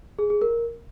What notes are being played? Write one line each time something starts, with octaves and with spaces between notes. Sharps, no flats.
G#4
G#4
A#4